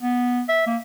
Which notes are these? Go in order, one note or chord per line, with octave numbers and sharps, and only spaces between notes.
B3
E5
A#3